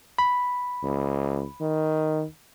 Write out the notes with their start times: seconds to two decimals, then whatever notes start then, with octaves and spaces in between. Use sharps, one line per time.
0.19 B5
0.84 C#2
1.61 D#3